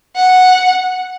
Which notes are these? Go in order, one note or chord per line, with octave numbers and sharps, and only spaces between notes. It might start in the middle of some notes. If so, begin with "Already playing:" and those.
F#5